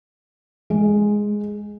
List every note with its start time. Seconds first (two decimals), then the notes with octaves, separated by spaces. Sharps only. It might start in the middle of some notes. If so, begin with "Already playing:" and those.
0.70 G#3